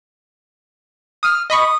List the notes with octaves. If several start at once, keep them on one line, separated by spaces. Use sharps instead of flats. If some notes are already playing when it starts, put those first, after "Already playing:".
D#6 F6
D#5 B5 C#6 D#6